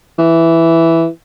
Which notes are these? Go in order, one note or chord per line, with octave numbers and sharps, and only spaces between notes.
E3